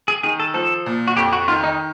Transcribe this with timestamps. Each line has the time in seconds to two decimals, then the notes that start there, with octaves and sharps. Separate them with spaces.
0.08 G#4
0.23 D#3 G#4
0.40 A4
0.54 F3 A4
0.86 A#2
1.08 F#4
1.16 F2 G4
1.33 F#4
1.48 D#3 F4
1.64 D#4